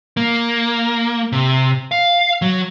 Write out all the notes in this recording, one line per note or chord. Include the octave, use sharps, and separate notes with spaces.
A#3
C3
F5
F#3